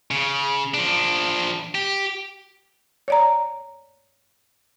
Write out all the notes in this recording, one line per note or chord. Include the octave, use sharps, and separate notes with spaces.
C#3
F3 D4
G4
C#5 D5 A#5